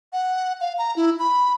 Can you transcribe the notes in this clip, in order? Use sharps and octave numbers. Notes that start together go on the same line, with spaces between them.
F#5
F5
A#5
E4
B5